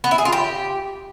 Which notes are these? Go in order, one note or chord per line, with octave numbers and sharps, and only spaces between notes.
B3
E4
G#4
F4
G4